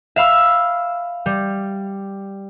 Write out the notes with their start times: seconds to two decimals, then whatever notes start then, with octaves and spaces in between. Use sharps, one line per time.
0.16 E5 F5 B5 E6
1.26 G3